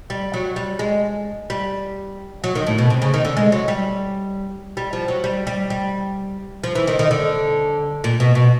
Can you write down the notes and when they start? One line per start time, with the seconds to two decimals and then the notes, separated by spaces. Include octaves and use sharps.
0.10 G3
0.34 F#3
0.56 G3
0.79 G#3
1.50 G3
2.44 F#3
2.55 D#3
2.67 A2
2.78 B2
2.90 C3
3.02 C#3
3.14 D#3
3.25 D3
3.37 G#3
3.52 F#3
3.68 G3
4.77 G3
4.93 F3
5.08 F#3
5.24 G3
5.47 G3
5.70 G3
6.64 F3
6.75 E3
6.87 D#3
6.99 D#3
7.11 D3
8.04 A#2
8.20 B2
8.35 B2